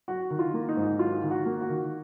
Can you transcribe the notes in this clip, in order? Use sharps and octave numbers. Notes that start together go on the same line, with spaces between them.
F#3 F#4
D#3
F4
A#3
D#4
G#2
F#3 F4
D#3
F#4
A#3
F#4
D#3